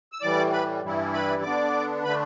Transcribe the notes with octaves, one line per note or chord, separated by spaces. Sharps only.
E6
A2 E3 G3 D5 D6
B4 B5
G2 E3 G3 E4
B4 B5
D3 B3 D4 D5 D6
D3 A3 D4 B4 B5